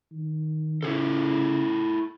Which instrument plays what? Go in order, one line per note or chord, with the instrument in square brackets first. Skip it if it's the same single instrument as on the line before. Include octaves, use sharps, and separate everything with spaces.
[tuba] D#3
[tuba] C#3 [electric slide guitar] E4 G#4 A4